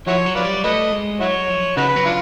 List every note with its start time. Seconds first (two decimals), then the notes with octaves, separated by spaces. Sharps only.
0.07 F3 E4 F#4 C#5
0.26 F#3
0.35 F4 B4 D5
0.45 G3
0.64 A3 B4 D#5
0.92 G#3
1.20 F#3 E4 F#4 C#5
1.49 F3
1.77 C#3 D#4 F#4 B4
1.96 F#3
2.05 D4 F4